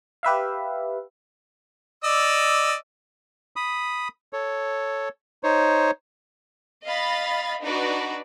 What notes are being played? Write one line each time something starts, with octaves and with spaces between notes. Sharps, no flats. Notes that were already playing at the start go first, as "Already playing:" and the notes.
G4 B4 E5 F5
D5 D#5 E6
B5 D#6
A4 C#5
D#4 C5 C#5
D#5 F5 B5 A6
D4 D#4 F#4 B4 D5